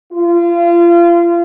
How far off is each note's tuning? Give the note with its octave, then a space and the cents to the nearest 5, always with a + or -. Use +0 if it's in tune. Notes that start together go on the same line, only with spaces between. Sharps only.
F4 -30